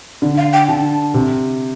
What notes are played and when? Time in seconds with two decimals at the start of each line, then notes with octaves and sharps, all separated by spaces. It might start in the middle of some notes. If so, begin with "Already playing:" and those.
0.22 D3
0.37 F5
0.53 G5
0.69 D3 A5
1.14 C3